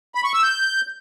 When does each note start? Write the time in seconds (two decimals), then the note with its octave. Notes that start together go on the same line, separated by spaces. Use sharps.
0.15 B5
0.24 C#6
0.34 E6
0.43 G6